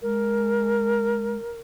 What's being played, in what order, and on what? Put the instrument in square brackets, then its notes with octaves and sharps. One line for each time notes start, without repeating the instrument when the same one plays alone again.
[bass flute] G#3 [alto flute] A#4